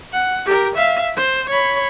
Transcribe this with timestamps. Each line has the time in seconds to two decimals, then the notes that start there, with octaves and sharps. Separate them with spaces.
0.13 F#5
0.46 G4 A#4
0.76 E5 F5
1.17 C5
1.49 C#5 B5